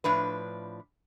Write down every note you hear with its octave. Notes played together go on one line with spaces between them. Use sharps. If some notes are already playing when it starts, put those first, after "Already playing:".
A2 F3 D4 B4